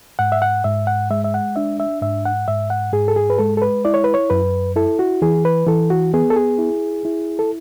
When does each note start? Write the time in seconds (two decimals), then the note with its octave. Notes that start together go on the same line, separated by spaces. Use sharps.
0.19 G#2 F#5
0.32 E5
0.42 F#5
0.64 G#2 E5
0.87 F#5
1.10 G#3 E5
1.24 E5
1.34 F#5
1.56 D4 E5
1.80 E5
2.01 G#2 E5
2.25 F#5
2.48 G#2 E5
2.70 F#5
2.93 G#2 G#4
3.08 A4
3.16 G#4
3.30 B4
3.38 G#3 A4
3.57 A4
3.62 B4
3.85 E4 D5
3.94 C#5
4.04 B4
4.14 C#5
4.30 F#2 B4
4.76 E4 A4
4.99 F#4
5.22 E3 G#4
5.45 B4
5.67 E3 A4
5.90 F#4
6.14 B3 G#4
6.30 A4
6.36 G#4
6.59 E4
7.05 E4
7.39 A4